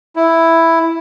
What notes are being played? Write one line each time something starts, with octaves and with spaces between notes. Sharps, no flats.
E4